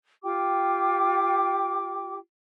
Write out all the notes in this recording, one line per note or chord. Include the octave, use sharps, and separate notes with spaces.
F4 G4 G5 D6